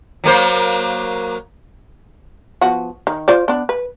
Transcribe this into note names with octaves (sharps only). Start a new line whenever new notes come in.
F#3 A#3 C5
F3 B3 F#4
D#3
F4 C5 D5
B3 D4
B4